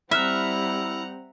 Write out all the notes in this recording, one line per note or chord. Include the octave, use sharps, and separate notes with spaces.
G3 C4 E4 E5 F#5 A#5 F6 F#6